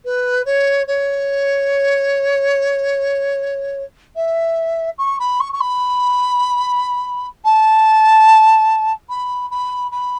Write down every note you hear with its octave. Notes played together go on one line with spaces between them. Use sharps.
B4
C#5
C#5
E5
C#6
B5
C#6
C#6
B5
A5
B5
B5
B5